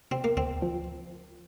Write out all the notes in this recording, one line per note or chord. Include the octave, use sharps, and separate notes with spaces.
C3 C4
A#3
D2 C4
F3